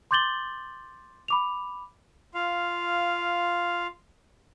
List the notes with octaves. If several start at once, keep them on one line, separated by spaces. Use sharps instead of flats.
C6 D6 G6 A6 F#7 G7
B5 D6 F7
F4 F5